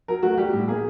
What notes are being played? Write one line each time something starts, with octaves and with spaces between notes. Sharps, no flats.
F#3 A#4
A3 F#4
G3 G4
A2
A#3 G#4